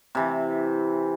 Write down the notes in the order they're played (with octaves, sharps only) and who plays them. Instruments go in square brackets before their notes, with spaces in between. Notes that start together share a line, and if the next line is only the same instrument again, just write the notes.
[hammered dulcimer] C3 E3